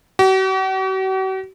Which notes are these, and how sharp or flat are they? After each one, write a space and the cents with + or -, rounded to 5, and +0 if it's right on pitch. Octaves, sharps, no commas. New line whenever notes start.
F#4 +45